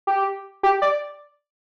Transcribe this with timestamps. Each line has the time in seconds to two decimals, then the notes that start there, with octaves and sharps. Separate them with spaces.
0.07 G4
0.63 G4
0.82 D5